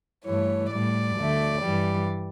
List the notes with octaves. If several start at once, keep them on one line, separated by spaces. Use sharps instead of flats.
G2 E3 A3 C#5
A2 G3 D5
D2 D3 A3
G2 E3 G3